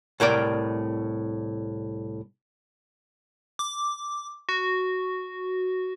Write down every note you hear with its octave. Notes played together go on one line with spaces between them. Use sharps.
C2 A2 A#4 D5
D6
F#4